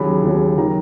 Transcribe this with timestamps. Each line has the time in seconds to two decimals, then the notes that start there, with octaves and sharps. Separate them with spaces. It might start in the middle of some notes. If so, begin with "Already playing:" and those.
Already playing: D#2 C#3 F#3 B5
0.23 D#2 C#3 F#3
0.57 D#3 F#3 A#5